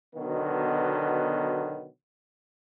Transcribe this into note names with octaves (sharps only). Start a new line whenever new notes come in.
B2 D3 D#3 F#3 B3